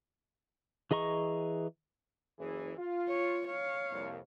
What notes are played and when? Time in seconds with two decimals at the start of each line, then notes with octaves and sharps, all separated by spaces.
0.91 E3 G#4 D#5 A#5 C#6
2.39 F#1 E3 G#4
2.78 F4
3.09 C#5
3.47 C#5 F5
3.91 C2 F2 A#2